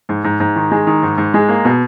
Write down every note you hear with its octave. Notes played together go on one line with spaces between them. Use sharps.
G#2
G#2
G#2
D#3
G#3
D#3
G#2
G#2
G#3
A#3
B2